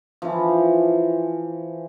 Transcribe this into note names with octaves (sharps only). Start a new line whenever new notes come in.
E3 F3